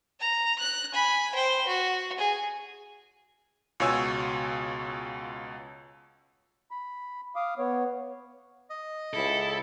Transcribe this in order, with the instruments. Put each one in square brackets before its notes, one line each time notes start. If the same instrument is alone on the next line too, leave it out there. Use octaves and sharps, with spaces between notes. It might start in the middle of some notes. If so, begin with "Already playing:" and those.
[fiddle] A#5
F#6
G#5 B5
C5 G5
F#4
G#4
[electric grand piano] C#2 B2 F4 C#5 G#5 E6
[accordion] B5
F5 D6 D#6
B3 C#5
[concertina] D#5
[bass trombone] C#2 [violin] E4 [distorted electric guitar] A4